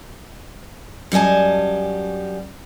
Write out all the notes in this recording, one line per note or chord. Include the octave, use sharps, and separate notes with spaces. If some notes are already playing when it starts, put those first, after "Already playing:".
F#2 G3 D#5 G#5 A5